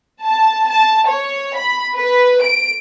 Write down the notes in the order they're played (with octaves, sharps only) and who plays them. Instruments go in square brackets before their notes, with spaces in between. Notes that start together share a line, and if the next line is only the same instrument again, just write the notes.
[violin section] A5
A5
C#5
B5
B4
D7